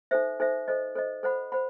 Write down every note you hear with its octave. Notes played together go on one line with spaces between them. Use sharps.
D#4 A4 C5 E5
D#4 A4 C5 E5
A4 C5 D#5
A4 C5 D#5
A4 C5 F#5 B5
C5 F#5 B5